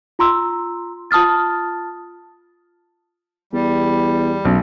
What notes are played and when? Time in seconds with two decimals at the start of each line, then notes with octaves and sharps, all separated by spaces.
0.19 F4 A#5 C6 E6
1.11 F4 A5 D#6 F6 A6
3.53 E2 G3
4.45 B1 F#2